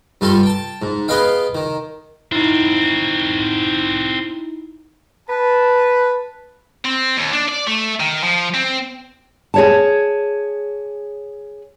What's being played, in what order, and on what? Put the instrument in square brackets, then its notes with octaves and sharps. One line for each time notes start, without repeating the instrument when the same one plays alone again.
[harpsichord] G2 G3 F4 A4 C6
G5 A5
G#2
B3 G#4 B4 D#5 F5 G5
D#3
[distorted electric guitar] C4 F#4 [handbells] D#4 E4
[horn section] B4 A5
[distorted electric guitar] C4
D#2
D4
D5
A3
D#3
F3
C4
[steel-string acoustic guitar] G#4 C#5 A5